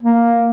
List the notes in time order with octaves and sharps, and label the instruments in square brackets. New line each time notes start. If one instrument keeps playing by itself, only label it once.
[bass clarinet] A#3